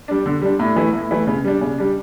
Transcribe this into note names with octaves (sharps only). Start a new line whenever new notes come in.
G3 D4
D3
G3 D4
A2
E3 A3 E4
A2
E3 A3 E4
C#3
G3 D4
C#3
G3 D4